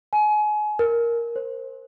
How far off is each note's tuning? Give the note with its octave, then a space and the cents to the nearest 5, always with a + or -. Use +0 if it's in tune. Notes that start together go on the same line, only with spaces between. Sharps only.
G#5 +30
A#4 +5
C5 +25